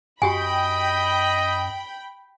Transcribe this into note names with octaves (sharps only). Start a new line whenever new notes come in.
F#2 F#4 G4 D#5 G5 G#5 B5